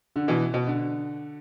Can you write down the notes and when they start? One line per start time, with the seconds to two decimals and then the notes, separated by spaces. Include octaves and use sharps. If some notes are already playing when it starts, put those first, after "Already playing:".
0.16 D3
0.28 B2 E3
0.54 B2
0.67 D3